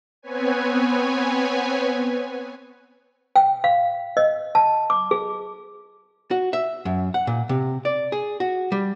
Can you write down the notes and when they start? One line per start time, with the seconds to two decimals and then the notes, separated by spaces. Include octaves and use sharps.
0.22 B3 C4 B4 C#5 G#5
3.36 G5
3.64 F5
4.17 D#5
4.55 A5
4.90 D6
5.11 G#4
6.31 F#4
6.53 E5
6.85 F#2
7.14 F#5
7.27 A#2
7.49 C3
7.85 D5
8.12 G#4
8.40 F#4
8.72 G3